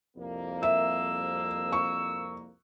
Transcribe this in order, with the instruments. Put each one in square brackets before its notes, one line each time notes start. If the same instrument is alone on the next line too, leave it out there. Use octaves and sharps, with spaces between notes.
[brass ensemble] C2 F2 A#3
[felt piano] E5 [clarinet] E6
[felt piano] C#6